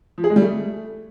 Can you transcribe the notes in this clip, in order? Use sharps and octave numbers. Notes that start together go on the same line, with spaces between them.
F3
G#4
G#3
G3
A3